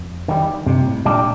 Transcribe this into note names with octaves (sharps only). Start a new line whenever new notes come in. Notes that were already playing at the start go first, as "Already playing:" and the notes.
Already playing: F2
D#3 G3
G2 C3
A#2
A2
A#2 G3 D4